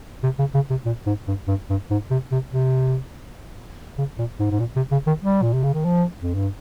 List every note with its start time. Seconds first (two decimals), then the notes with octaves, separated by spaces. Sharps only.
0.23 C3
0.39 C#3
0.54 C#3
0.70 C3
0.85 A#2
1.06 G#2
1.28 G2
1.48 G2
1.70 G2
1.91 G#2
2.11 C3
2.32 C3
2.53 C3
3.98 C#3
4.19 A#2
4.40 G#2
4.51 G#2
4.60 A#2
4.76 C3
4.92 C#3
5.07 D#3
5.23 G3
5.42 A#2
5.53 C3
5.63 C#3
5.74 D#3
5.85 F3
6.22 F2
6.35 G2